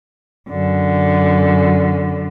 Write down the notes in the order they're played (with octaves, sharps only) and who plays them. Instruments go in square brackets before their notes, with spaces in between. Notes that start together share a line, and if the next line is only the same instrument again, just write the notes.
[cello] F#2 D3